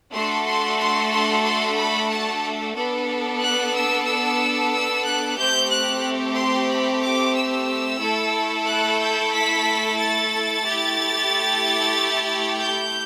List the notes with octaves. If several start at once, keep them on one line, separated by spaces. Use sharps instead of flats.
A3 D4 F#4 A4 C6
C6
C6
C6
C6
B5
A5
B3 D4 A4
F#6
E6
E6
E6
F#6
A3 C4 G4 G6
F#6
C6
B5
D6
E6
A3 E4 A4
F#6
G6
B6
A6
A3 E4 G4
G6